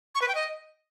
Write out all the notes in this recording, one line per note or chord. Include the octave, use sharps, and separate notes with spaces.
C#6
B4
G5
D#5